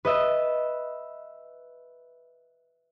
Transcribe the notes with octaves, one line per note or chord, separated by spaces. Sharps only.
B4 D#5 E5